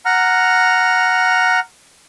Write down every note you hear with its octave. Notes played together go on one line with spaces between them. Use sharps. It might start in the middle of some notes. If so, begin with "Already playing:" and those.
F#5 A#5 F6